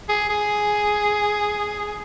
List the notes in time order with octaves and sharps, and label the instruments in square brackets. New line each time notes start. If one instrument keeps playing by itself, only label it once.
[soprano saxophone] G#4
G#4